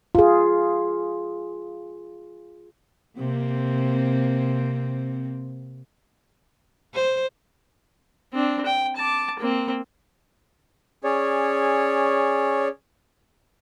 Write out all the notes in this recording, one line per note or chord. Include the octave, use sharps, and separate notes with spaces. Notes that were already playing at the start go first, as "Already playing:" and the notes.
F4 G#4
C3 A#3 C4
C5
C4 D4
G5
A5 D6
A#3 C4
C#4 G#4 C#5 D5